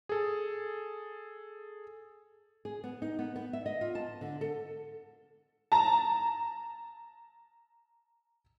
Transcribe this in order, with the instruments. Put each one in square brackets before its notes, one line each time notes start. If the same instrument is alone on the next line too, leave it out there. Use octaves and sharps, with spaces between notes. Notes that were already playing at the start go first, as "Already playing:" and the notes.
[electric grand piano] G#4 A4
[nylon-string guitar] G#4
B3
D#4
B3
B3
E5
D#5
F4
A5
D3
A4
[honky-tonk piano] A5 A#5